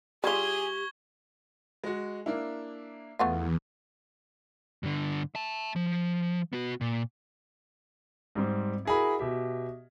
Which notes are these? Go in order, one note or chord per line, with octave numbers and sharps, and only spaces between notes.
G3 F4 G4 G#4 C#6 G#6 G7
G#3 F#4
A#3 D4 E4
E2 A3 B3 F4
G2 D3
E5 A5
F3
B3 F#4
A#2
G#2 G3 C4
E4 F#4 G#4 A#4 B5
B2 G4 E5